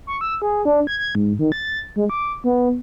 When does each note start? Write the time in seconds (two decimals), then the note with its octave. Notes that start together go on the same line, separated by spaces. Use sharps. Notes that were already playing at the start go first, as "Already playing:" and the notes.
0.07 C#6
0.21 E6
0.42 G#4
0.65 D4
0.87 G#6
0.99 G#6
1.15 G#2
1.39 D#3
1.52 A6
1.96 G#3
2.10 D6
2.44 B3